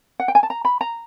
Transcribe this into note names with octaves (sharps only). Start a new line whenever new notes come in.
F#5
G5
G#5
A5
A#5
B5
A#5